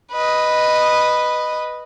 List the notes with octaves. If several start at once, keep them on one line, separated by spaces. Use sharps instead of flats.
B4 D#5